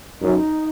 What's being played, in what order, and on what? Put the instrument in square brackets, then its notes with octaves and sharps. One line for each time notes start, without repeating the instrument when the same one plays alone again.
[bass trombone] F#2 [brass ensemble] D#4